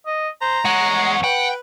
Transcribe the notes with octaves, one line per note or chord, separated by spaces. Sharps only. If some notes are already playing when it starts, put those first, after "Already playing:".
D#5
C5 A#5
E2 G#3 C#5 F#5
B4 F#5 G5